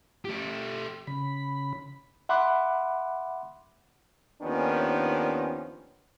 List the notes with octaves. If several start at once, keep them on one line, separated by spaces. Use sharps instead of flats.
A3 G4
C#3 B5
E5 F#5 B5 C6 D6 F#6
D#2 D#3 F3 B3 C#4 D4